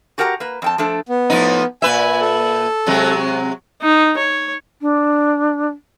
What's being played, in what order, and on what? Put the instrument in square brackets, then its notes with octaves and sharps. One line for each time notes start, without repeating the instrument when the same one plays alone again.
[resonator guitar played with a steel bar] F#4 G4 A#4 F#5 A5 A#5
A#3 B4
F2 G5 A5
F3 A3 D4 A4
[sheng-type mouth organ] B3
[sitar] A2 F3 D#4
[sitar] A#2 B4 E5 [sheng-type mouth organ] G#5
[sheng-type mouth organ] A4
[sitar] C3 F#3 G#3
[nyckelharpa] D#4
C#5
[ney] D4